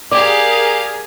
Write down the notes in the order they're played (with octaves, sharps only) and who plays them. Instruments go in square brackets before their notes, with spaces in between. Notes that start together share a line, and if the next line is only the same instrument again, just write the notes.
[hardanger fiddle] G4 F5 [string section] G#4 A#4 [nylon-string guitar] D5 [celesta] D6